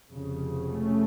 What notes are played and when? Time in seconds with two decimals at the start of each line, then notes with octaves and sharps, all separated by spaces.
0.13 F1 F2 C#3
0.70 A3 C#4